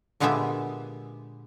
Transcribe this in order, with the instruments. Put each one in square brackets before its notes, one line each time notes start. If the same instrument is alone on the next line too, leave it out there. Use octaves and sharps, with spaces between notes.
[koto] A#2 D3 G#3 B3 G4 E5